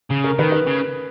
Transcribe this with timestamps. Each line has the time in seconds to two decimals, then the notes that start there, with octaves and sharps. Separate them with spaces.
0.11 C#3
0.24 A#4
0.39 D#3 B4
0.52 B4
0.67 C#3